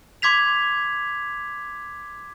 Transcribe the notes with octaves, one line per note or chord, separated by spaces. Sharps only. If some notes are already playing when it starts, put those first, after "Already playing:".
C6 D6 G#6 B6 F7